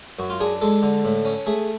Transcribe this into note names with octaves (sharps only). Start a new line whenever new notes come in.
F#2 F#4
F4
D4 G#4
G#3 A4
D3
A2
C#4
A3 G#4